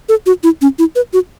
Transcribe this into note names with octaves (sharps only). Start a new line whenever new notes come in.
A4
F#4
E4
C#4
E4
B4
F#4